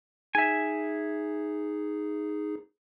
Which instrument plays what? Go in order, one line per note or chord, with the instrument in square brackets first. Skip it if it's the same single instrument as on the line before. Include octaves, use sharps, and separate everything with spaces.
[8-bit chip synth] D#4 G#4 [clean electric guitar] E5 G#5